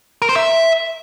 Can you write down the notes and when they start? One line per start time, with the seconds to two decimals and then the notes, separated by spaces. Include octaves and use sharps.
0.22 A#4
0.29 C5
0.36 E5